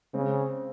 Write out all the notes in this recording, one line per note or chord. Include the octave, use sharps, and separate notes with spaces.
C#3 G#3 C4